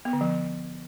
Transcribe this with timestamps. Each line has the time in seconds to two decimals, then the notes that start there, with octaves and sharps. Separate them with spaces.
0.05 B3
0.13 D3
0.21 F3